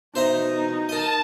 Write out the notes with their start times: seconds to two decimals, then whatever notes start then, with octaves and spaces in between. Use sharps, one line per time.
0.15 B2 D#4 C5 E5 A#5
0.89 A#4 D#5 A5